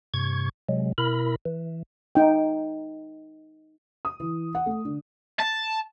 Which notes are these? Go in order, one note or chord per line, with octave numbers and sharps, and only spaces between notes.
G2 C3 C#6 G#6
C3 F#3 G#3
B2 E4 A#4 B5
E3
D#4 G5
D#6
E3
F#5
A3
D3
A5